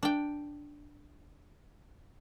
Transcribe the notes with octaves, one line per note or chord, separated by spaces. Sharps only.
D4 G5